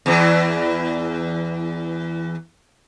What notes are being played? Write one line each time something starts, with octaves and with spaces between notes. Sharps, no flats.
E2 E3